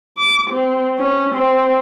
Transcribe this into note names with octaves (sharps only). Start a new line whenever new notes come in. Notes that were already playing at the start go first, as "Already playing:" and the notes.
D6
C4
C#4
C4